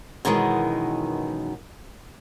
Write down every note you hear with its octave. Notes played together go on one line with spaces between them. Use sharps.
F#2 B2 D#3 E3 G#3